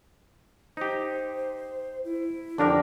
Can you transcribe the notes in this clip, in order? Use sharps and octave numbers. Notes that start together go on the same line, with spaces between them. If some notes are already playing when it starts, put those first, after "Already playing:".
D#4 G4 C5
E4
F2 D3 D4 G4 A#4 D5